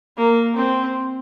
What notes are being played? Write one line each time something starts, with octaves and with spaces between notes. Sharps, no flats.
A#3
C4